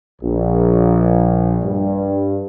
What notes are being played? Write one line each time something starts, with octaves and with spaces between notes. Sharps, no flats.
A#1
G2